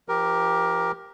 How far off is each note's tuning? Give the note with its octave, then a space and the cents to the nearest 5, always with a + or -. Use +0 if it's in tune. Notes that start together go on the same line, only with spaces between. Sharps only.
F3 -25 G4 +0 A#4 +10